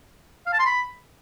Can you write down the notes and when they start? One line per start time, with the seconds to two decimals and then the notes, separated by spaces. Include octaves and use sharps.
0.46 F5
0.53 A5
0.59 C6
0.66 B5